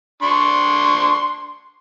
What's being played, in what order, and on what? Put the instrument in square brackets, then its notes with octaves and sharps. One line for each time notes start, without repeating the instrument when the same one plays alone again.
[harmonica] D4 C6 C#6